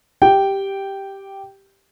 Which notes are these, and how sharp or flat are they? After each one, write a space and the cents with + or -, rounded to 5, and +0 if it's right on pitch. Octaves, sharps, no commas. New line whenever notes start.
G4 +0 G5 -5